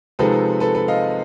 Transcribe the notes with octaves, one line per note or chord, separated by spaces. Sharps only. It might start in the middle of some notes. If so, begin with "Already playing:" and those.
C3 F3 G#3 C4 D#4 A4 B4
A4 B4
A4 B4
D#5 F5